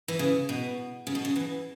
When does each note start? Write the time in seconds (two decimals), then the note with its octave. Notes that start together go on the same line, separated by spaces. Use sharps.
0.08 E3
0.19 C#3
0.49 B2
1.07 C#3
1.15 B2
1.25 C#3
1.36 E3